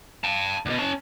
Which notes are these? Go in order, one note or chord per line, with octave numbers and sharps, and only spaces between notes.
G5 A5
D2 B2
C#4 A5